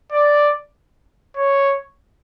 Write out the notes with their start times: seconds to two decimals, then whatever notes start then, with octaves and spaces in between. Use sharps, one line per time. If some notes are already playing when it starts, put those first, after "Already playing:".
0.12 D5
1.36 C#5